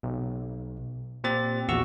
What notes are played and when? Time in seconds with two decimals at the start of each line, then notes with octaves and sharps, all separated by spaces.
0.03 B1
1.24 A#2 C4 G4 A6
1.69 A#1 E2 F#4 C#6 E6